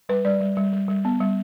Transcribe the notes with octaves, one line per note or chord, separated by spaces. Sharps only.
G3 B4
G3 D5
G3
G3
G3
G3
B3
G3